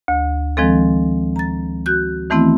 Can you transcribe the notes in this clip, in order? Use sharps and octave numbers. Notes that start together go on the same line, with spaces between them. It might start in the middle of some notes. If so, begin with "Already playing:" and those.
D2
D#3 F3 G#3 C4 A4
A#5 A6
F#4 F#6 G6
D#3 E3 A3 B3 C4 E4